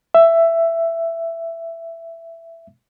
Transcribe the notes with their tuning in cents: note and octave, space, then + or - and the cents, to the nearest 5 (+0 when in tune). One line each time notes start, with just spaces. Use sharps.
E5 +10